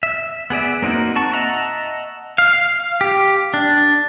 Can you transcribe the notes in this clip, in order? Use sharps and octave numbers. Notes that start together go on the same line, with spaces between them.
E5
B3 G#4 D5 E5
A#3 C4 D#4 F#4 A#4
F#4 A5 C#6
D#5 E5 F#5 A5 A#5
F5
G4
D4